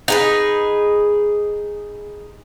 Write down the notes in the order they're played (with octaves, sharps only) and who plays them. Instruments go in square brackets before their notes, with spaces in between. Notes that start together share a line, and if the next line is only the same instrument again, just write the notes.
[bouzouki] D#4 G#4 B4